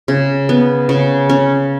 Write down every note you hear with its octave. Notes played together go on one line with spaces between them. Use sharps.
C#3
B3
C#3
C#4